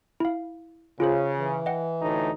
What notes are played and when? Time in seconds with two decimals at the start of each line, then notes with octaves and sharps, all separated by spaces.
0.20 E4 F5
1.00 C#3 F4 G#4 C5
1.37 E3
1.66 D#5 F#5 G5
2.02 D2 A2 D#4